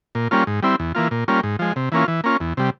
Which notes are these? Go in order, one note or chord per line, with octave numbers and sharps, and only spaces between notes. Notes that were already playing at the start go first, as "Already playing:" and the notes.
A#2
G3 A#3 C#4 F4
G#2
G3 C4 E4
E2
E3 A#3 F4
A#2
G3 A#3 C#4 F4
G#2
F3 G#3
C3
E3 A#3 C#4 F4
E3
A#3 C#4 F4
E2
C3 G3